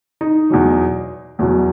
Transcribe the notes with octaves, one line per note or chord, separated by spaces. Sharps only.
D#4
E2 B2 F#3
E2 B2 F#3